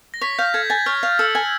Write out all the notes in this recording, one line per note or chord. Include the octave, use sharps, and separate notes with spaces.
A#6
C#5 B6
F5 G6
A4 G#6
G#5 A6
C#5 F6
F5
A4 E6
G#5